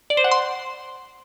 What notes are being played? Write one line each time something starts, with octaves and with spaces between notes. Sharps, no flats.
D5
C5
F#5
C6